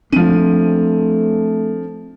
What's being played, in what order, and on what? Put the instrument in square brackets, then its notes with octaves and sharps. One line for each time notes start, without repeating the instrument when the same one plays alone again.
[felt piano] F3 D#7 [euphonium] A3 [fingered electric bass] C4 D4